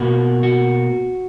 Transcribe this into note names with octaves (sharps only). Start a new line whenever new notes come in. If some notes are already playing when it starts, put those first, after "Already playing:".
Already playing: B2 A#3 F#4
F#4